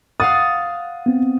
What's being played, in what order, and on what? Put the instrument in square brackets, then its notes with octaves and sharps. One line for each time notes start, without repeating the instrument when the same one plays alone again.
[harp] F5 F#5 A6 [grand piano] D#6
[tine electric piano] B3 C4